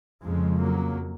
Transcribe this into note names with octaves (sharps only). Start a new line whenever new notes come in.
F2 C#3 F3 G#3
F#3 A#3